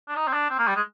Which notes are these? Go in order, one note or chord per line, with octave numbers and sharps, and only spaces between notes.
D4
D#4
C4
D4
C4
A#3
G3
G#3